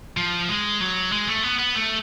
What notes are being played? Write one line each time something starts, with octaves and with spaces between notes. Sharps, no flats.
F3
G#3
F#3
G#3
A3
B3
B3
A3